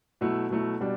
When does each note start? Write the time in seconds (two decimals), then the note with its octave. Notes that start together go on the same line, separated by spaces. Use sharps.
0.21 B2 F#3 A3 E4
0.50 B2 F#3 A3 E4
0.80 B2 G3 D4